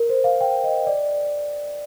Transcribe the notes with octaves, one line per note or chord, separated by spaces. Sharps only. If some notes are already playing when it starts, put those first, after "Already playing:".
Already playing: A#4
C5
F5
G5
D#5
D5